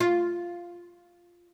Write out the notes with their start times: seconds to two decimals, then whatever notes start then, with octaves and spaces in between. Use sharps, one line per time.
0.01 F4